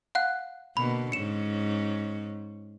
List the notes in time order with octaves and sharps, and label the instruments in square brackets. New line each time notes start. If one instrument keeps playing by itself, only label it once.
[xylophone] F5 F#5 F#6
[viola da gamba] B2 D3 A#3 [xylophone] B5
[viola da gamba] G#2 C#4 [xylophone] C#7 E7